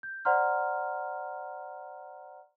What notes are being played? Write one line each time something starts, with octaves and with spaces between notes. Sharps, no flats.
G6
C5 D5 F#5 A#5 C6 F6